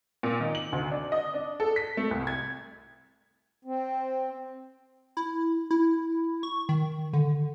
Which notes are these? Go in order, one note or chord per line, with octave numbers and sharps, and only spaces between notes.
A#2
D#3
F#7
D2
D4
D#5
D4
A4
B6
A3
C2
G#6
C4
E4
E4
C#6
D#3
D3